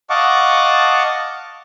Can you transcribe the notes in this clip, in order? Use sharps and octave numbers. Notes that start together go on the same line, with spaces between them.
D#5 F5 F#5 A5 C#6 D6